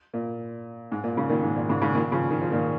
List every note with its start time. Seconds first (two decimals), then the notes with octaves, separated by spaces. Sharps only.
0.14 A#2
0.92 G#2
1.04 A#2
1.17 G#2 C#3
1.29 A#2 D#3
1.43 G#2
1.56 A#2
1.69 G#2 C#3
1.82 G#2 C#3
1.95 A#2 D#3
2.12 C#3 F3
2.30 D#3
2.41 F3
2.51 A#2 D#3